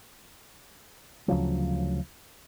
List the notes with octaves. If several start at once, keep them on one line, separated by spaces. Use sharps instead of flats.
D2 C#3 F3 F#3